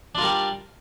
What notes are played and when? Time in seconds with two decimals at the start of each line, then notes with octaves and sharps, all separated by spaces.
0.15 D4
0.18 F4
0.21 A#4
0.24 G3